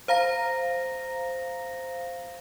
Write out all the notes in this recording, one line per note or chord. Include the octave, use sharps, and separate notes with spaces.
C5 F5 A#5 A#6